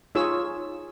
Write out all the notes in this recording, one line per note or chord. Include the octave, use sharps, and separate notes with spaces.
D#4 F4 G#4 C#5 E6